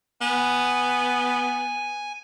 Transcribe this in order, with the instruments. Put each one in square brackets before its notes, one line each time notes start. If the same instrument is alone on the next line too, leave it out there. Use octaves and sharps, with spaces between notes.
[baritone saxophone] B3 [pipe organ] G#5